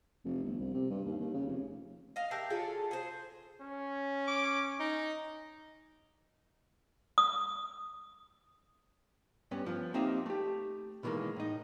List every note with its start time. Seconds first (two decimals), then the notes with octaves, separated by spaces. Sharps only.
0.25 F1
0.44 G1
0.60 C2
0.74 C3
0.90 G2
1.05 D#2
1.19 D#2
1.34 C#3
1.47 F1
2.16 D#5 F5
2.31 D4 G4 A#4 E5
2.50 F#3 F4 G#4 A4
2.91 G#4 C5
3.62 C#4
4.27 D6
4.79 D#4
7.18 D#6
9.51 G2 B3 C#4
9.66 F3 B3
9.94 A#3 C4 D#4 G4 E5
10.26 A3 G4
11.03 B2 D#3 E3 G#3 A#3
11.36 A2 D#4